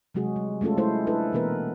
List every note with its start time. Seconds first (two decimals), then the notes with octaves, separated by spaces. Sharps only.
0.15 C3 F#3 G#3 F#4 G#4
0.36 G3
0.61 G#3 A3 C#4 F4 A4
0.77 G#3 A3 E4 A4 C5
1.07 D4 E4 A4 B4
1.33 B2 E3 A#3 B3 A#4 B4